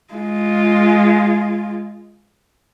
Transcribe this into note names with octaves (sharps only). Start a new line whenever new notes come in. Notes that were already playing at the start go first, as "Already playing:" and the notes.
G#3 F4